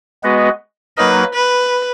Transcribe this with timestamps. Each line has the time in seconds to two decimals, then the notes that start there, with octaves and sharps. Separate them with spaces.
0.23 G#3 B3 F#4 B4 D#5
0.97 F#3 A#3 D#4 A#4 B4 D#5
1.34 B4